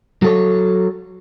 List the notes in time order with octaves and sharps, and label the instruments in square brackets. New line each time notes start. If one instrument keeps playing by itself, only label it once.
[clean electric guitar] F#3 A4 C#5